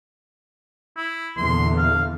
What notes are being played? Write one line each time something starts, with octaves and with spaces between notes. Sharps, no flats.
E4
E2 A#2 D3 C6
F5